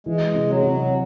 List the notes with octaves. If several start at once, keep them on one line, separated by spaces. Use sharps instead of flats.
E3 G#3
C3
F#3
C3